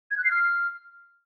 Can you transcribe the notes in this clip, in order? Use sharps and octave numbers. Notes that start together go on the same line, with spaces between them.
G#6
F#6
C7
F6